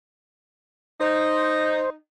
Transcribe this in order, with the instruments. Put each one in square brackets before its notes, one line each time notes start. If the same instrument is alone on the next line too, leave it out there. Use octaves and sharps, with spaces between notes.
[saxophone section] D#4 [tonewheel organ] C5